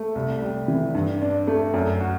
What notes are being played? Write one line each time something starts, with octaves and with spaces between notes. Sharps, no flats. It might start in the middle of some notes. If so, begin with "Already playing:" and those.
Already playing: A3
C2
G3
E3
G2
D4
A3
F#2
F#4